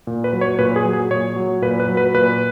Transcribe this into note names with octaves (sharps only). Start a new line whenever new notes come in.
A#2
B4
F#3
C#5
A#2 B4
G#4
F#3
G#4
A#2 C#5
F#3
A#2 B4
B4
F#3
B4
A#2 B4